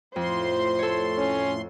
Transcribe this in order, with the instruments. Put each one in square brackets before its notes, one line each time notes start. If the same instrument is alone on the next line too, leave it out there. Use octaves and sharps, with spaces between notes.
[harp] F2 [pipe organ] A2 C6 [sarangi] C5
[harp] A4 C#5
[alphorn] C#4